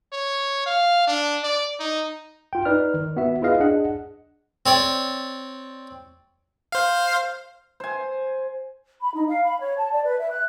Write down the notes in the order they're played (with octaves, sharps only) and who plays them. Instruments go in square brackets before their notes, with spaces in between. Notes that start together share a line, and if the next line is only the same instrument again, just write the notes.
[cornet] C#5
F5
D4
D5
D#4
[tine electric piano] F4 G5
D#4 B4 D5 F6
D#3
B3 F#4 E5
E4 F4 G#4 B4 D#5 F5
D4 G#4 D#5 F#5
[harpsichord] C4 C#5 D5
[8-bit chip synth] C5 F5
[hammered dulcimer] C5 G#5
[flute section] B5
D#4
F5
B5
C#5
A5
D5
B4
E5
F#6